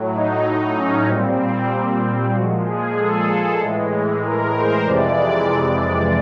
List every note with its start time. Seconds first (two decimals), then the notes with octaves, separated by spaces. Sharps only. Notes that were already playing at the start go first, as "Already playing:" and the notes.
Already playing: A2 F#3
0.15 D#4
0.46 D#4
0.77 C#4
1.08 A#2 G3 C4
2.34 A#2 F3 G#3 F#4
2.66 G#4
2.98 A4
3.60 A2 E3 G#3
4.23 A#4
4.55 C5
4.86 F2 C3 E3 G#3 D5